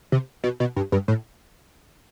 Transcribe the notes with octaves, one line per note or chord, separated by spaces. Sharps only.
C3
B2
B2
G2
G2
A2